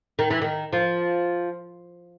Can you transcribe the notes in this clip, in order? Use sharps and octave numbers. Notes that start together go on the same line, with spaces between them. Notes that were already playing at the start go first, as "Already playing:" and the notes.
D#3
E3
D#3
F3